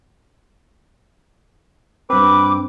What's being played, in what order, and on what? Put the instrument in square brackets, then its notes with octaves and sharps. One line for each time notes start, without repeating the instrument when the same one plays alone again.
[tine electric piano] G2 C4 [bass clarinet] B4 [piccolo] D6